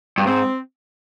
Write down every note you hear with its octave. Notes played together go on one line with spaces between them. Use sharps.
G2
G#2 C4